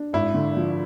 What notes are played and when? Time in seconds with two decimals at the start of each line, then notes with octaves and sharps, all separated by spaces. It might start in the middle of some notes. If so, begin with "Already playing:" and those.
Already playing: D4
0.13 G#1 E4
0.34 D3
0.57 F3